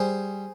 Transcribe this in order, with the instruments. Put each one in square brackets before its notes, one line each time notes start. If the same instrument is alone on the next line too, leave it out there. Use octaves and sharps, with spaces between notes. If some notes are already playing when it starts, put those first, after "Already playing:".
Already playing: [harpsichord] G3 G#4 C5